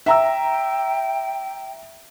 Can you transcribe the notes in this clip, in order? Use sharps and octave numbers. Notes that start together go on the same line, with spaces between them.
E5 G5 A#5 E6